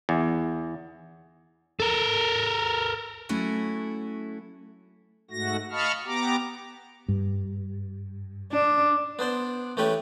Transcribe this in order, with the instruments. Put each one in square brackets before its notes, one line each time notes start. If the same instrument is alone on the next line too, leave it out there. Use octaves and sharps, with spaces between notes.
[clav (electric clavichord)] E2
[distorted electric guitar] A4 A#4
[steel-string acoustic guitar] F#3 A3 C#4 E4 F#4 A4
[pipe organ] G#2 A3 F#4 A#6
D#5 F5 A5 B5 C#6 F6
B3 G4 A#5 D6
[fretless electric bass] G2
[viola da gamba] D4
[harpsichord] B3 D4 C5 D5
E3 A3 C#4 G4 B4 C#5